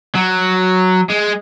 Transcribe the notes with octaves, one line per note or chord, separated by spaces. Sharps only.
F#3
G#3